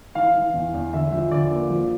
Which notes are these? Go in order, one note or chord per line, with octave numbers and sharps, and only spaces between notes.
E3 F5
E3
E2
E2
D3 E5
F3 E5
D3 D5
A#3
F3